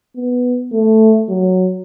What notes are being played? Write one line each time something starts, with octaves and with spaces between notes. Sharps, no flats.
B3
A3
F#3